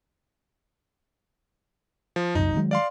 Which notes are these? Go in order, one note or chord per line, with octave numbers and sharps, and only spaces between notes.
F3
F1 C2 F#2 D#4
D#3 F#3 G#3
D5 F5 C6